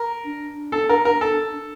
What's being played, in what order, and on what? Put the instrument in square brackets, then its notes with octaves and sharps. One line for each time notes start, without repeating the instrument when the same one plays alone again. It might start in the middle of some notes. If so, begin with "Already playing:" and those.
Already playing: [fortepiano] A#4
[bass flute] D4
[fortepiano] A4
A#4
A#4
A4